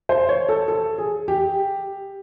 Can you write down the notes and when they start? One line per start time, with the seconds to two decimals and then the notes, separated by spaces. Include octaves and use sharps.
0.09 C5
0.29 C#5
0.49 A4
0.68 A4
0.98 G#4
1.28 G4